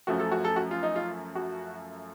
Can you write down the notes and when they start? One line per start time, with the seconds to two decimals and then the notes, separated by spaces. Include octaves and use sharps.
0.07 F#2 F3 A3 F#4
0.20 A4
0.31 F#4
0.45 A4
0.56 F#4
0.71 F4
0.83 D#4
0.96 F4
1.35 F#4